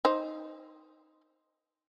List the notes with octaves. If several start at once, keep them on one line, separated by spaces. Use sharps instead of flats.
D#4 C5